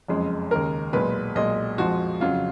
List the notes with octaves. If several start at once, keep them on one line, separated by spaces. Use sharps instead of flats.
F#1 F2 C#3 G#3
D#2 C#3 G#3 A#4
B1 A#2 G#3 B4
B1 A#2 G#3 D#5
F2 F3 G#3 F#4
F2 C#3 F#3 F4